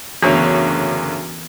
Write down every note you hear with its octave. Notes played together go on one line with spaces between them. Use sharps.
F#1 D2 E3 B3 C#5